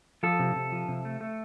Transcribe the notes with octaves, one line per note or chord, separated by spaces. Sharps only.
F3 A4
C3
C3
F3
C3
A3
A3